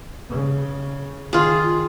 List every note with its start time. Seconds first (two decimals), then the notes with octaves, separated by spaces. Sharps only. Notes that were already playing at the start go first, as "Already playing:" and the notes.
0.29 C#3
1.33 D#3 F4 G#4